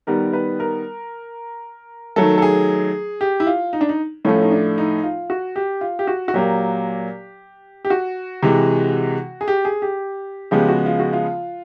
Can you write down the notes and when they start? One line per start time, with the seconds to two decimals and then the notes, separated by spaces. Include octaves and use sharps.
0.07 D#3 G3 B3 A#4
0.33 B4
0.60 A#4
2.16 D#3 F#3 A3 A4
2.38 A4
2.42 G#4
3.21 G4
3.40 E4
3.47 F4
3.73 D#4
3.81 D4
3.89 D#4
4.25 A2 F3 A3 C#4
4.42 D#4
4.52 D4
4.78 D#4
5.03 F4
5.30 F#4
5.56 G4
5.81 F4
5.99 G4
6.07 F#4
6.28 F#4
6.34 A#2 F#3 A#3 G4
7.85 G4
7.90 F#4
8.43 C3 E3 G#3
9.41 G#4
9.48 G4
9.65 G#4
9.82 G4
10.51 C#3 F3 G#3 B3 G4
10.68 F#4
10.86 F4
11.00 F#4
11.13 F4